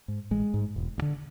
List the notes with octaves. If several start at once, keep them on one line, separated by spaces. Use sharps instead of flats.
G#2
A1 G#3
G#2
E1
D2
D3